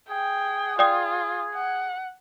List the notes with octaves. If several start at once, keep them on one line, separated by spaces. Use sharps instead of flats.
G#4 G5
F4 D5 G5 D#6
F#5